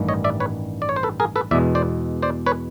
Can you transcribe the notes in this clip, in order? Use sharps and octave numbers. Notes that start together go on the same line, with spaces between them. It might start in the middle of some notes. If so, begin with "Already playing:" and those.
Already playing: A1 G2 D#3 G3
C#5 D#5
D5 E5
B4 C#5
D5
C#5
C5
A4 B4
G#4 A#4
A4 B4
E2 B2 G#3 D5 E5
C5 D5
C5 D5
B4 C#5